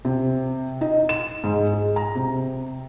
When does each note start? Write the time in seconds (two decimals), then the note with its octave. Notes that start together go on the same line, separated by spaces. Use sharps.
0.05 C3
0.81 D#4
1.09 E7
1.44 G#2
1.73 G#3
1.96 A#5
2.15 C3